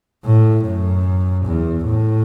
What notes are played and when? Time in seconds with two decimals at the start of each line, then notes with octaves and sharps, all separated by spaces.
0.25 A2
0.66 F#2
1.46 E2
1.85 A2